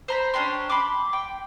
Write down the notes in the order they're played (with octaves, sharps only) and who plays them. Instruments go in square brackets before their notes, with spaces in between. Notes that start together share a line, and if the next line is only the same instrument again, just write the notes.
[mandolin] C5 A#5 B5
C#4 D4 G4 C6
B5 C6 D6
G5